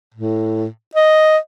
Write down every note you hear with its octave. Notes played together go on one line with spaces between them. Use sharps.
A2
D#5